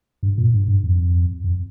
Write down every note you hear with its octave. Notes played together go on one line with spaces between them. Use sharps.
G2
A#2
G2
G2
F2
F2